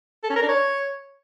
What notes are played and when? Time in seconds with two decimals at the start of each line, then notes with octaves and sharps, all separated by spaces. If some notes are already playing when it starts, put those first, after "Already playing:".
0.24 A4
0.30 C#4
0.36 A#4
0.42 D4
0.49 C#5